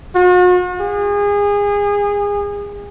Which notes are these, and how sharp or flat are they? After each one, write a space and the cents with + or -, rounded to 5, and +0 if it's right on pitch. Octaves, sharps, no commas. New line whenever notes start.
F#4 -45
G#4 -30